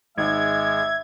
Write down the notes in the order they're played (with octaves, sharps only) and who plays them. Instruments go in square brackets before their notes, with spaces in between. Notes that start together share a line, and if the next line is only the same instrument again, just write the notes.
[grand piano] G#1 [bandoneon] G#3 [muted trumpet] E5 [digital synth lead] G#6